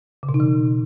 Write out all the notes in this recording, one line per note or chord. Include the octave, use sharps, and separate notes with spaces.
C#3
B2
D#4
E3